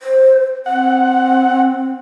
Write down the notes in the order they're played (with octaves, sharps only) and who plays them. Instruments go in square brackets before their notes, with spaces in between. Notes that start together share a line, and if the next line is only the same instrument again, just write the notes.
[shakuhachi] C5
[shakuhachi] C4 [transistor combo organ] F#5